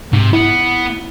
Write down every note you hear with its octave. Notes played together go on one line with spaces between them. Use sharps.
G#2 C3
B3 E4